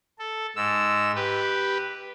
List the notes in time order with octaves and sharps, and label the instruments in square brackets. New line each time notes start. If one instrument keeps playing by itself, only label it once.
[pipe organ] A4
G#2 E6
G4 B4